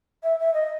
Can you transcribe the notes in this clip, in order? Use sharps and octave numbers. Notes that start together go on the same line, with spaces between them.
E5
E5
D#5